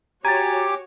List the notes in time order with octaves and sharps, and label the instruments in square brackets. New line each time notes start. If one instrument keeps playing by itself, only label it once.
[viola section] F#4 C#5 [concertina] G4 D6 [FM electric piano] G#5 [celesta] A#5 A6